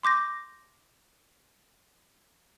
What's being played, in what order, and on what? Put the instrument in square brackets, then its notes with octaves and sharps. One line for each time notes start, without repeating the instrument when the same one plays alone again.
[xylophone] C6 D6 G6 A#6